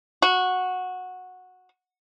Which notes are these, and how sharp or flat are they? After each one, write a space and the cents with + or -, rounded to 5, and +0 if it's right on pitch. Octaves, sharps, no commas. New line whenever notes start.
F#4 -10